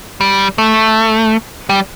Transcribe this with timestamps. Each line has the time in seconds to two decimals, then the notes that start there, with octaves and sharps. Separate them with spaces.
0.21 G3
0.58 A3
1.69 G3